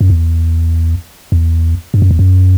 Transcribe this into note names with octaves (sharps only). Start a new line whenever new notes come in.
F#2
E2
E2
G2
F#2
E2
F#2